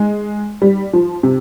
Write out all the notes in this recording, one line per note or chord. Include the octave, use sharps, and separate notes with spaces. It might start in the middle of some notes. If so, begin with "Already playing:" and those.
Already playing: G#3
G3
F3
C3